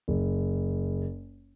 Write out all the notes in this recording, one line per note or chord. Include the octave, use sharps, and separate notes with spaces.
F#1